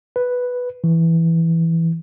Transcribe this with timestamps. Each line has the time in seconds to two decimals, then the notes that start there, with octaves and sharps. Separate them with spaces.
0.16 B4
0.84 E3